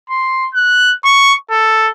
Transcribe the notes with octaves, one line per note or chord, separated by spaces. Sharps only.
C6
F#6
C#6
A4